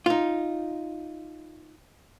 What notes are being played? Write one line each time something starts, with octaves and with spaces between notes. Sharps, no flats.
D#4 F4